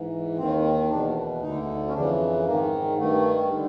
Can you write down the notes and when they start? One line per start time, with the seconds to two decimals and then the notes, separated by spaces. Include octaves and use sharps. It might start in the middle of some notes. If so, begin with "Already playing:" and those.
Already playing: G#2 E3
0.37 D#2 D#3 C4
0.89 E2 B2 D4
1.41 D2 D3 D#4
1.88 C#4
1.94 F2 C#3 E3 D4
2.45 G#2 D#3 A#3
2.97 G2 D#3 A3
3.53 D3